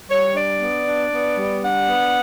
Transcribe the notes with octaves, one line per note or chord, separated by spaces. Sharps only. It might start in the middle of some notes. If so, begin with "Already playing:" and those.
G3 C#5
D4 D5
B3
D4
B3
G3
D4 F#5
B3